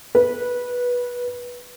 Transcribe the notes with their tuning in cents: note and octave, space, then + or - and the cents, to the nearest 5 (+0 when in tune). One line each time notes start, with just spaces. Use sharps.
B4 -15